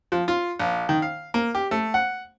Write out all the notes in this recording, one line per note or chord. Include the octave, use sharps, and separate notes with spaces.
F3
F4
A#1
D#3
F5
A#3
G4
A3
F#5